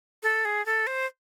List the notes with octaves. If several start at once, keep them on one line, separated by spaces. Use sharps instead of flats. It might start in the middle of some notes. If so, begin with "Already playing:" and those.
A4
G#4
A4
C5